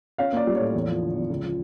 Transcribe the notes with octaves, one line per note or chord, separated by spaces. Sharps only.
C#4 F5
A#3 D5
G3
A2 C#5
E2
F3
D3
E2
C#2
F3